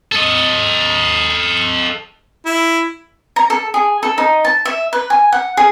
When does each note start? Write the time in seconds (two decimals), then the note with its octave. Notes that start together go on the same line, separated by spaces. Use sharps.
0.12 A4 D#5
2.46 E4
3.36 A#5
3.50 A4
3.74 G#4
4.03 A4
4.18 D#4
4.45 A5
4.65 E5
4.93 B4
5.10 G#5
5.32 F#5
5.57 G#4